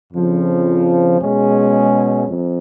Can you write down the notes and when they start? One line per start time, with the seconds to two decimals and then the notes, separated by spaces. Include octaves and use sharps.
0.12 F2 C#3 F3
1.21 B2 G#3 C#4 G#4
2.29 F2